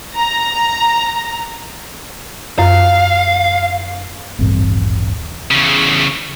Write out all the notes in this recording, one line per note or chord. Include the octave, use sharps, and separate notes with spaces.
A#5
F#2 F4 F5
D#1 A1 G2 C4
E2 C#3